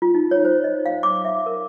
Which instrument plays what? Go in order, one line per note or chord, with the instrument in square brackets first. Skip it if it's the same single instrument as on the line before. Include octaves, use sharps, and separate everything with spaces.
[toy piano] F4
D#4
C#5
C5
D#5
F5
D6
E5
A#4